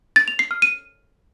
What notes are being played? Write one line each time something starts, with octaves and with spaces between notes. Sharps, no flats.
A6
F7
C7
F6
D#7